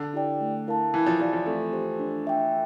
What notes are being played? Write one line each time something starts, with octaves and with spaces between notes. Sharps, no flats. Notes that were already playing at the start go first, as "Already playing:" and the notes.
Already playing: D3
E4 G4 D5 G5
A3
E4 A#4 F5 A5
E3 E4
F3
F3 G4 D5 F5 A5
F3
A3 C4
G4 C5
D4
A4 E5 G5